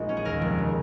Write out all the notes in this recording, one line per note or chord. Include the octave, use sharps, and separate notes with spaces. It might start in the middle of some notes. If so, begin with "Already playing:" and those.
Already playing: A#1 G#3 D#4
C#4
G#4
D#2 A#4
F1
C#3